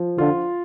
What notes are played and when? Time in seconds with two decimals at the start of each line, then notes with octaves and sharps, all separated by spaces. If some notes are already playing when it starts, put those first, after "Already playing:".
Already playing: F3
0.18 D3 F4